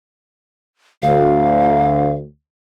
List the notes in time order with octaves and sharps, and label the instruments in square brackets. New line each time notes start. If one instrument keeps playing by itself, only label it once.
[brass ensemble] D2 [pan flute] F5